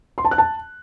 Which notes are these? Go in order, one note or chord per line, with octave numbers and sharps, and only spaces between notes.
C6
A5
F#6
A5